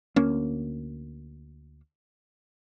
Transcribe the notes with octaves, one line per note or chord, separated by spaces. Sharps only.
D2 A#3 C#4